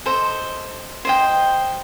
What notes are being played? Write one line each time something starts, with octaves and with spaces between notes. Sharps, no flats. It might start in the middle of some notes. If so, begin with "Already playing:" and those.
A4 C5 D#5
C5 D#5 G5